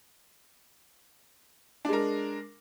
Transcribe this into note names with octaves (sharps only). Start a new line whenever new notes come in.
G#3 D4 A#4